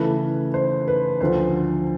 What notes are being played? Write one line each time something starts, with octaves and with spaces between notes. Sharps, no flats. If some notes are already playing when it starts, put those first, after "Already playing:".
Already playing: C#3 E3 A3 B4
C5
B4
D2 D3 F3 C5